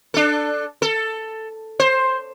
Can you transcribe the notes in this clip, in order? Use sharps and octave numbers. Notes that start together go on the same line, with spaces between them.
D4 A4
A4
C5